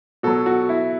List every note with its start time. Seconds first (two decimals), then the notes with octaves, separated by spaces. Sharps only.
0.23 B2 F#3 F#4 A4
0.46 F#4
0.69 E4